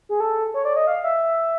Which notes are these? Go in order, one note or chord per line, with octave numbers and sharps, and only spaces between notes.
G#4
A4
C#5
D5
D#5
F5
E5